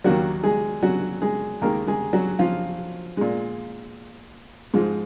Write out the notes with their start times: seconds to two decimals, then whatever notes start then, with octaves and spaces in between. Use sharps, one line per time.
0.04 D#2 D#3 F#3 A#3 F#4
0.43 G#3 G#4
0.83 F#3 F#4
1.22 G#3 G#4
1.61 D#2 D#3 G#3 A#3 A#4
1.87 G#3 G#4
2.13 F#3 F#4
2.39 F3 F4
3.17 A#2 G#3
4.74 G#2 F3 G#3